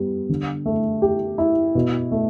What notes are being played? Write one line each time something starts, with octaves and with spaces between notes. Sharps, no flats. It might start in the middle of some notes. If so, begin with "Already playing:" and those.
Already playing: G3 B3
D3
A3
G4
E4
B2
A3